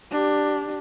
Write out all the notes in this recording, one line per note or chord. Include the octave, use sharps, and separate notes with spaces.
D4 G4